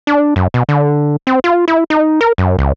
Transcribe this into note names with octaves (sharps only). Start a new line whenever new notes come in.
D4
F#2
B2
D3
C4
F4
E4
D#4
A#4
F#2
C#2